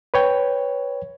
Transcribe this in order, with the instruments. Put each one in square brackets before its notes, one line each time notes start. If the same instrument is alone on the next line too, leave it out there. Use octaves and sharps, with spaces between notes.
[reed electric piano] B4 C#5 G5